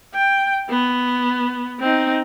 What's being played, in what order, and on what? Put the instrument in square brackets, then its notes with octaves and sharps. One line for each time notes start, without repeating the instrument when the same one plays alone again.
[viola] G5
B3
C4 D#4